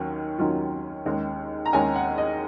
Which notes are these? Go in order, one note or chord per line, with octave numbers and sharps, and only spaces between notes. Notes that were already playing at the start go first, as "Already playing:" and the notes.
Already playing: D#2 D#3 F#3 C#4
D#2 D#3 F#3 C#4 F4
D#2 D#3 G#3 C#4
A#5
D#2 D#3 G#3 C#4 G#5
F#5
D#5